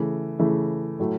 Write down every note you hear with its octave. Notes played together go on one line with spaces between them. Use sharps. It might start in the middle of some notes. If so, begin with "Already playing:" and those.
Already playing: C#3 E3 A3
C#3 E3 A3
A2 F#3 A3